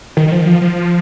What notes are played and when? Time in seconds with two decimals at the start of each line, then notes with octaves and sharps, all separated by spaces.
0.17 D#3
0.28 D#3
0.32 F3
0.41 D#3
0.46 F3
0.61 F3